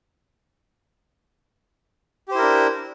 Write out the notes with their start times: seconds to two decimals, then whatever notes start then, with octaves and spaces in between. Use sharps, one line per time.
2.28 G4
2.32 C5
2.35 E4
2.38 A#4
2.42 D4